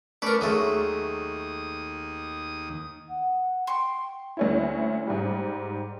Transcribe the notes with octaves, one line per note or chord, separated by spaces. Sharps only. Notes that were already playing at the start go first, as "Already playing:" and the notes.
A3 C#4 A#4 B4 D5
D#2 F#3 G#3 A3 D#6
F#5
G5 C6 C#6
D2 C#4 E4
G#2 G3